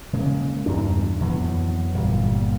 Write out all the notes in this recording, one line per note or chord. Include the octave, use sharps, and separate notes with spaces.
C#3 G#3 A#3
E2 G2 D4
F2 E3 F#3 B3
G1 A#2 G3 A#3